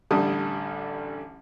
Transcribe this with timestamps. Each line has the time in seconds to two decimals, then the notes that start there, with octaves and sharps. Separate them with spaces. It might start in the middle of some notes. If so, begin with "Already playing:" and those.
0.11 A1 D3 G3 A5 D#6